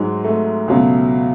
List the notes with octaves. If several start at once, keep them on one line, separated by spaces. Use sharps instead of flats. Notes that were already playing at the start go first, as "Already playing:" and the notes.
Already playing: G#2 F#3 G#3
A3
C#2 B2 F#3